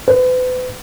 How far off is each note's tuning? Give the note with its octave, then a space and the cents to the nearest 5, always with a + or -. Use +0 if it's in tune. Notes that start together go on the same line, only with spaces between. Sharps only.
B4 +40